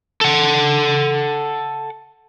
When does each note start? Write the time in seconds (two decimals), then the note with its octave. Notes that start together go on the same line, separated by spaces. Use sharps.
0.21 A4 F#5